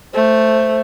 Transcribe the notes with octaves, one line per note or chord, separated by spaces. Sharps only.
A3 C5